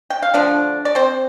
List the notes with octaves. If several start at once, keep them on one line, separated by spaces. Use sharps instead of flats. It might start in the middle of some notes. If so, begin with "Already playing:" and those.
G5
F5
D3 F3 A3 D4 D5
D5
C4 C5